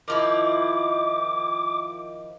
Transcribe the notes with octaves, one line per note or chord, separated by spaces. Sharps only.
D#3 F3 E4 D6